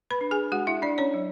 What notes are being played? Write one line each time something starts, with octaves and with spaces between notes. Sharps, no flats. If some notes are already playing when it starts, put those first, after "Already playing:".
B4 B5
D4
G#4 G#5
G#3 F#4 F#5
E4 E5
D4 D5
C#4 C#5
F#3